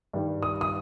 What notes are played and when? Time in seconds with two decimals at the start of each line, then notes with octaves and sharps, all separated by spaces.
0.13 G2 D#3 G3
0.43 D#6
0.61 D#6